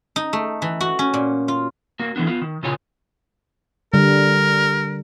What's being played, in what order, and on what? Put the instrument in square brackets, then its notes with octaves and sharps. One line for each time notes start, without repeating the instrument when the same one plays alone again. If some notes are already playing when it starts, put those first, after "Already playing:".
[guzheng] D#4
A3
E3
F#4
C#4
A#2
F4
[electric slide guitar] A#3 F#4
E3 A3 B3 D4
B3 F4
D#3
A#2 C#3 F4 C#5 G#5
[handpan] D3 G3 [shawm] A#4